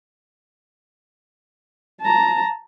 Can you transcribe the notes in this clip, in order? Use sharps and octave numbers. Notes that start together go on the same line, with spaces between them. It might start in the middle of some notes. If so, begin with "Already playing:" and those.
A5 A#5